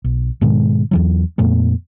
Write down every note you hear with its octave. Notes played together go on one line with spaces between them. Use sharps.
B1
G#2 B2 D#3 G#3
E2 E3 F#3
F2 A#2 A3 B3